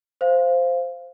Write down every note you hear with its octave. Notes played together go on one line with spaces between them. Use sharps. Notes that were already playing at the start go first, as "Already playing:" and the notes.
C5 F5